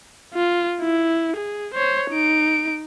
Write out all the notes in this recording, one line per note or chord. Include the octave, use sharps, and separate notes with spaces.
F4
E4
G#4
C5 C#5
D#4 D7